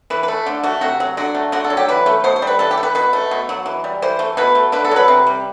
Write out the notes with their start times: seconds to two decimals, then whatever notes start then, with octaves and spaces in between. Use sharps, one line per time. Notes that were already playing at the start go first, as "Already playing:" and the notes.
0.10 E3 B4
0.23 B4
0.28 A3
0.46 D3
0.63 A3 F#4
0.81 C3 F#4
1.00 F#3
1.17 D3 F#4
1.35 A3
1.52 D3 F#4
1.64 A4
1.70 F#3
1.77 G4
1.88 E3 B4
2.06 A3
2.24 B2 C5
2.36 C5
2.42 G3 B4
2.59 E3 A4
2.71 G4
2.77 A3
2.83 B4
2.95 B2 B4
3.13 A3
3.31 B2
3.49 F#3
3.66 E3
3.84 G3
4.02 E3 C5
4.19 A3
4.37 B2 B4
4.55 A3
4.72 D3 B4
4.85 A4
4.91 F#3 B4
5.08 C3
5.27 G3